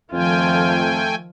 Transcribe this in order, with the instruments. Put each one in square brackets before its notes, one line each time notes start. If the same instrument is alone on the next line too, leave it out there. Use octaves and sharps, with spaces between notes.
[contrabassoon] F2 [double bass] D#3 F3 [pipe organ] A3 G5 G#5 [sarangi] F4